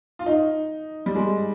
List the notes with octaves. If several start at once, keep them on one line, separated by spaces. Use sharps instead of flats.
F4
D#4
G3
G#3